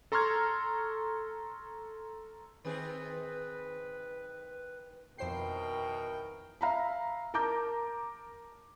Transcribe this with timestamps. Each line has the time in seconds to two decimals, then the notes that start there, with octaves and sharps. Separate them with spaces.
0.12 A4 A#5 C6 C#6 F6 G#6
2.65 D#3 C4 G#4 B4
5.18 F2 B2 D#3 E3 A#4 C5 G5 C7
6.61 E5 F5 A#5 B5
7.34 A#4 A5 A#5 D6 G6